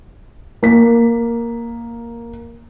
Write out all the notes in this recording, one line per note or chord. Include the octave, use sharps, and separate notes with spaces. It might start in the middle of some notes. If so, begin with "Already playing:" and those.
A#3 B6